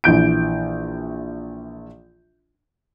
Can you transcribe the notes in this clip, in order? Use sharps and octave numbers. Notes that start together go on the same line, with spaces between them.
A#1 E3 G6 D7